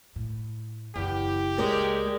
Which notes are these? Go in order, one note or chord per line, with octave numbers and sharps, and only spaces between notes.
A2
F#1 E2 C#3 G4
C#2 G#3 A#4 D5